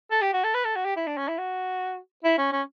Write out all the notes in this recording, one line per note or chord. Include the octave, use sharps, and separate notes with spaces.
A4
G4
F#4
A4
B4
A4
F#4
G4
E4
D4
C#4
E4
F#4
E4
C#4
C#4